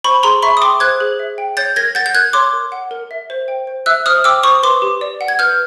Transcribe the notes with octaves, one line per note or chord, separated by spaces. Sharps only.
C5 B5 C#6
G#4 A#5 C6
E5 B5 C#6
D#6
G5 C6 D6
C5 F#6 G#6
G#4
E5
G5
C#5 G6 A6
A#4 G#6 A#6
F#5 G6 A6
G6
A#4 F#6 G#6
C#5 C6 D6
A#4
F#5
A#4
E5
C5
G5
C5
E5 E6 F#6
C5 D#6 F6
G5 D6 E6
C5 C#6 D#6
B4 C6 D6
G4
D5
F#5
G#6
B4 F6 G6